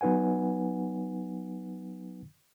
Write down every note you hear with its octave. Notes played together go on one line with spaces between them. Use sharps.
F#3 B3 D#4 B4 F#5 G#5